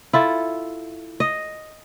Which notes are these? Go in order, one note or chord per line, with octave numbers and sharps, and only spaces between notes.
E4 F4 A4
D#5